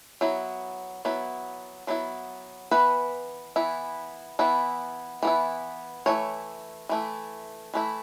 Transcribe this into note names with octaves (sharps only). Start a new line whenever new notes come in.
F#3 B3 E4
F#3 B3 E4
F#3 B3 E4
E3 B3 E4 B4
E3 B3 E4
E3 B3 E4
E3 B3 E4
E3 A3 E4 C#5
E3 A3 E4
E3 A3 E4